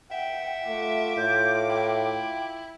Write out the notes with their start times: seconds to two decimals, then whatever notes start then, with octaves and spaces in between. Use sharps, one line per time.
0.12 E5 F#5 G5
0.67 A3 F4 D6
1.17 A2 G6
1.70 E4 G5